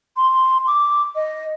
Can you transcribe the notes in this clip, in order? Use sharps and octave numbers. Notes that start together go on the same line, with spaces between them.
C6
D6
D#5